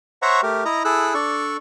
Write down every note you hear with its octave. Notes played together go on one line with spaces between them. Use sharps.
C5 C#5 E5 F#5 A#5 C#6
A3 G4 A#4
E4 D#5 A#5
E4 G#4 A4 E6 F#6
D4 A4 D5 C#6